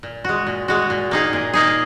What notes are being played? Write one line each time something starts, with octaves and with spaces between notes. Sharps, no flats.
A#2
G#3 F#4
A#2
G#3 F#4
A#2
A#3 D#4 G#4
A#2
A#3 D#4 G#4